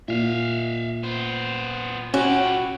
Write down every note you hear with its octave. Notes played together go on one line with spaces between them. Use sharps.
A#2 E5 F5
B3 C5
C#4 E4 F#4 G4